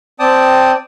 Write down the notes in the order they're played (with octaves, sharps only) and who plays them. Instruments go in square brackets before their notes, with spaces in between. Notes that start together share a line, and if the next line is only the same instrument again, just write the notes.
[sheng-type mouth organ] C4 D5 G5 A5 D#6